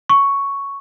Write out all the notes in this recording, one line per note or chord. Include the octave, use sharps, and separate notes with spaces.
C#6